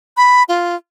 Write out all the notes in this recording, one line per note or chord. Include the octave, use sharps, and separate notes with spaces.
B5
F4